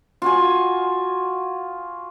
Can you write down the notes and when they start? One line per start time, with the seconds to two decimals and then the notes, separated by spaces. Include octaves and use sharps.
0.22 F4 F#4 G#5